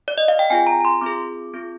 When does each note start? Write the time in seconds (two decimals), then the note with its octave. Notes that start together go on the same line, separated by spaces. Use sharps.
0.08 D5
0.18 D#5
0.28 F5
0.39 G5
0.50 C4 F4 G#4 G#5
0.67 A#5
0.80 A#5
0.85 C6
1.01 C4 F4 G#4 D6
1.53 C4 F4 G#4